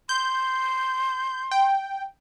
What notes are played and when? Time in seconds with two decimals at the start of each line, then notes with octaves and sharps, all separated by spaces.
0.09 C6 G6
1.51 G5